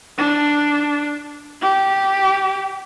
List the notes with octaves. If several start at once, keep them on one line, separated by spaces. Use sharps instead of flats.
D4
G4